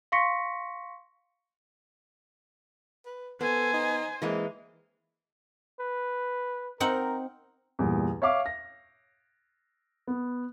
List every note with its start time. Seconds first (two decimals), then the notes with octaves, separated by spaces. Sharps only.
0.12 F5 C6 C#6 A#6 B6 C#7
3.05 B4
3.41 B3 A4 C5 G#5
3.73 D#4
4.22 E3 G#3 A#3 C4
5.80 B4
6.80 C4 D#4 A#4 F#5
7.79 E2 G2 A#2
8.22 C#5 E5 F5 D6
8.46 A#6
10.07 B3